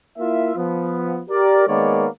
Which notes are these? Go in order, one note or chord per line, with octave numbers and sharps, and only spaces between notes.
A#3 E4 F4 E5
F3 B3
G4 A#4 D5
D#3 G#3 A#3 B3 C#5 D5